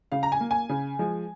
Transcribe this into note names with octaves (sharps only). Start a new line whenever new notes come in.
C#3 F5
A#5
G#5
A#3
G#5
C#3
F3 G#3